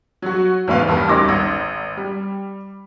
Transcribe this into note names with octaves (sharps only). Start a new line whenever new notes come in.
F#3 F#4
E2 G#2 A3 B4 F5
E2 G2 A#4 A5 B5
D2 G3 C#4 D#4 D6 A#6
G#1
G3